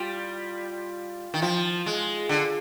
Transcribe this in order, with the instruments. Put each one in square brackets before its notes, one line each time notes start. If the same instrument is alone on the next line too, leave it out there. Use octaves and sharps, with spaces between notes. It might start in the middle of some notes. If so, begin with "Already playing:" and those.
Already playing: [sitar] G3 [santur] F4
[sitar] D#3
[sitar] F3 [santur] F4
[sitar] G#3
D3